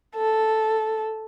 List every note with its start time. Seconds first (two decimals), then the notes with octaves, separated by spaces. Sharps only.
0.16 A4